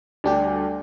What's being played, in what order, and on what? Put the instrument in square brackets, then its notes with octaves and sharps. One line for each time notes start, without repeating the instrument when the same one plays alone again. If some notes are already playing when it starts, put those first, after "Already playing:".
[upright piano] D2 [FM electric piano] G3 D4 G4